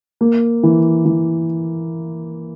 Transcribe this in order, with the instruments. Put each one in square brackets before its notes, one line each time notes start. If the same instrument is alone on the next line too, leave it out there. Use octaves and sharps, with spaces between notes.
[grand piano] A#3
E3
E3